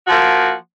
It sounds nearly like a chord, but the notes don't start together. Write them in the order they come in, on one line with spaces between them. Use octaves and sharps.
F#4 F3 A#3